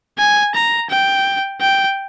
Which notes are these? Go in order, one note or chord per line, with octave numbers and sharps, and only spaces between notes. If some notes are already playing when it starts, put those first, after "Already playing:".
G#5
A#5
G5
G5